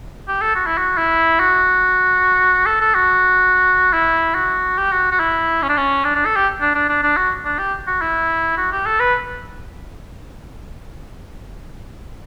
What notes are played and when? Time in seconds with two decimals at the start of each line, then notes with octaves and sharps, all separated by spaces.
0.28 G4
0.42 A4
0.55 F#4
0.67 E4
0.78 F#4
0.97 E4
1.40 F#4
2.67 A4
2.81 A4
2.95 F#4
3.93 E4
4.35 F#4
4.78 G4
4.92 F#4
5.11 F#4
5.20 E4
5.62 C#4
5.69 D4
5.77 C#4
6.05 D4
6.15 D4
6.26 A4
6.36 G4
6.61 D4
6.75 D4
6.89 D4
7.03 D4
7.17 F#4
7.45 D4
7.59 G4
7.88 F#4
8.02 E4
8.58 F#4
8.72 G4
8.86 A4
9.00 B4